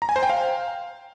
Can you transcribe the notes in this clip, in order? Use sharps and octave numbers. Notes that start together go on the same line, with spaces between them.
A#5
G#5
C5
G5
F5